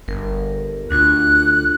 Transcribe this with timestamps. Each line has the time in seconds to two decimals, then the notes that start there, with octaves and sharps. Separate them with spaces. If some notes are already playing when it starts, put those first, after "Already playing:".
0.08 G1 A#4
0.91 D2 D4 F4 F#6